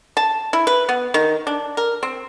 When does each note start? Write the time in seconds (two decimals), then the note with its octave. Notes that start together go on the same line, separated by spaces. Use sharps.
0.17 A5
0.53 E4
0.67 B4
0.89 B3
1.14 D#3
1.47 D4
1.77 A#4
2.03 C4